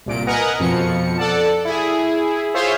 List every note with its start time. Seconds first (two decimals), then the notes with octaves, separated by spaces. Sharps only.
0.06 C2 A#2 D7
0.27 A#4 B4 D#5 F#5 G#5 A#5
0.60 F2 B2 F3 C#7
1.18 A4 D5 F#5 A5
1.65 E4 G#4
2.54 F4 G#4 C5 C#5 E5